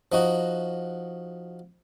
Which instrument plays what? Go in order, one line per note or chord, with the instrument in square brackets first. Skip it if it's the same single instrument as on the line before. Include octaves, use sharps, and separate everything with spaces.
[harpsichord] F3 D#4 F#4